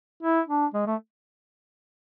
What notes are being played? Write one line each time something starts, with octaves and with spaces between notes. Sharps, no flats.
E4
D4
G#3
A3